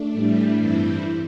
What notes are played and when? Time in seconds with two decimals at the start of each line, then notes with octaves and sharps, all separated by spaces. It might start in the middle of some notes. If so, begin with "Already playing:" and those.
Already playing: A3 D4
0.13 A2 E3 G3
0.58 G2 E3 G3 C4 E4